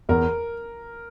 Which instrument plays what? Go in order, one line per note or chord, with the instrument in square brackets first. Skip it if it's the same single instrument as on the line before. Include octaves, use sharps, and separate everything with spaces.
[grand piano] E2 [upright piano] A#4